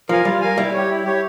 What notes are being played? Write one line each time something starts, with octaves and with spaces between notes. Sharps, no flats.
F3 A#4 F5 G#5
G3 F4
A#4 F5 G#5
G3 E4
G4 C#5
E4
G4 C#5